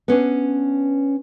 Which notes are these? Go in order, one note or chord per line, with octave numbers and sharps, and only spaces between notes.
B3 C#4 D4